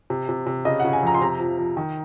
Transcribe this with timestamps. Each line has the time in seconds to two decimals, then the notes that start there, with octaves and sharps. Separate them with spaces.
0.10 C3
0.29 C3
0.46 C3
0.65 C#3 D#5
0.80 F#5
0.84 C#3
0.93 G#5
1.03 F2 A#5
1.15 C6
1.21 C3 A#5
1.39 F3
1.59 F3
1.77 D#3